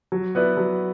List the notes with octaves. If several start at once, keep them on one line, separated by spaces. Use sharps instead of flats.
F#3
B3 E4 B4 D5
F#3